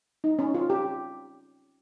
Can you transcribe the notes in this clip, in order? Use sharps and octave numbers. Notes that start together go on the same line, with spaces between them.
D#4
C#4
F4
G4